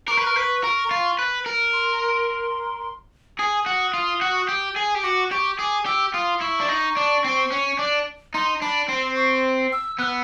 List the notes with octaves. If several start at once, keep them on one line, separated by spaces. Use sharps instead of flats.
A#4 C#6 D6
B4
A#4
B4
A#4
F4
B4
A#4
C6
G#4 D#6
F#4
F4
F#4
G4
G#4
G4
F#4 D6
G4 C#6
G#4 D6
G4 E6
F4 D#6
E4 C#6
D4
D#4
D4
C4
C#4
D4
D#4 C6
D4 B5
C4 C6
C#6
E6
B3 E6 F#6